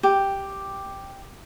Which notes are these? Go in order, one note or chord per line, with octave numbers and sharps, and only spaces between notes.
G4